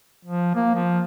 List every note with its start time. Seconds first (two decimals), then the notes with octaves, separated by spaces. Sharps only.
0.25 F3
0.55 A#3
0.75 F3